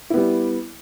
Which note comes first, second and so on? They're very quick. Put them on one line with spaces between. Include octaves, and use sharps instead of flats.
E4 B3 G3